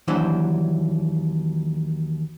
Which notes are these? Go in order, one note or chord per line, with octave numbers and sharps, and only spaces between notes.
D#2 E3 F#3 D4 C5 F#5